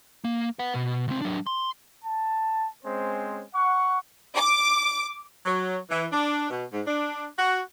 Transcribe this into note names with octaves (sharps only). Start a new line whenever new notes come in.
A#3
B4 F#5
B2
C#2 C4
F#3 D4
C6
A5
G#3 C4 C#4 C5
F#5 C#6
D6
F#3
E3
D4
B2
G#2
D4
F#4